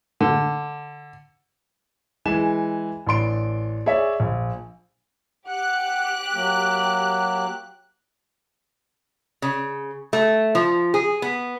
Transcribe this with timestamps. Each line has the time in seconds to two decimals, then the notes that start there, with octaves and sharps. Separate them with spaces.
0.21 D3
2.26 E3 G#3 G#5 E7
3.06 A1 D4 C6 D7
3.86 G#4 C#5 D5 E5
4.20 A#1
5.46 G4 F#5 F#6
6.34 F#3 A#3
9.42 C#3
10.13 A3
10.55 F3
10.94 G#4
11.22 B3